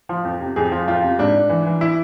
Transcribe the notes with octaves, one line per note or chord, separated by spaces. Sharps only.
F3
F2
C3
F2 G#4
F3
F2 F4
C3
G#2 D4
G#2
E3
E3
E4